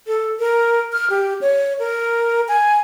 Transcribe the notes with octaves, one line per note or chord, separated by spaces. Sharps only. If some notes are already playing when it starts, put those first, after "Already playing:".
A4
A#4
F6
G4
C#5
A#4
G#5